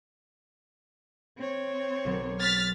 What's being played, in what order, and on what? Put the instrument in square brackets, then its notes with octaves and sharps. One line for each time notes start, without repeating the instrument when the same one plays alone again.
[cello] C4 C#5
[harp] B1 F#3
[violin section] F6 A6 B6